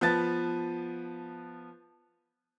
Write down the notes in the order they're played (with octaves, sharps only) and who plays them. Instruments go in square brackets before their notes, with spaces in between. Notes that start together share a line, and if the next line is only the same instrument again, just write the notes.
[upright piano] F3 B3 B4 A5 A6